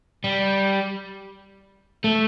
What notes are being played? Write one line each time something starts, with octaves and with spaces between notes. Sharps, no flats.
G3
A3